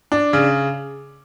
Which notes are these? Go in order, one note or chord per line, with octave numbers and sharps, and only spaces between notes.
D4
C#3